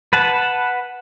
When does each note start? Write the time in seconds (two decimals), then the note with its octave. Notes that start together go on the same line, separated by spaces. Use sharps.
0.13 B4 F#5 A5